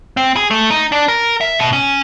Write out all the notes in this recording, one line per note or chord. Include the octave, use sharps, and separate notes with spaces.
C4
G#4
A3
D#4
D4
A#4
E5
B2
C#4